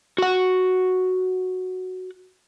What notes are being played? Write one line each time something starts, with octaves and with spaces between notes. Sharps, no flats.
F#4 F#5